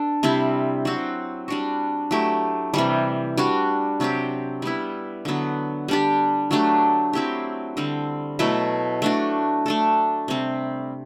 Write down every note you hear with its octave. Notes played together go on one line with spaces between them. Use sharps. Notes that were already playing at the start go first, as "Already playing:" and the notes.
Already playing: D4 A4
C3 G3 C4 E4
F#3 C4 F#4
G3 D4 F#4
F#3 A3 E4 G4
C3 E3 G3
G3 D4 F#4
C3 F#3 C4 G4
G3 B3 E4
D3 F#3 B3
G3 D4 G4
F#3 A3 D4 G4
F#3 C4 E4 G4
D3 G3 C4
B2 F#3 A3 E4
A3 D4 F#4
A3 D4 A4
C3 G3 C4